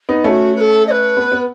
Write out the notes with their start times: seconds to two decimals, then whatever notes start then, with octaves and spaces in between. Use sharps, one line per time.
0.09 B3 D#4
0.24 A3 C#4 A4
0.28 F#4
0.55 B4
0.60 A4
0.87 D#5
0.90 B4
1.17 B3
1.32 B3